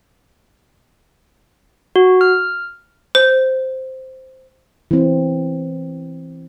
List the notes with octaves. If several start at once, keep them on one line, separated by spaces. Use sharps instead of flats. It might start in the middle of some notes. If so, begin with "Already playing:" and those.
F#4
F6
C5
E3 C4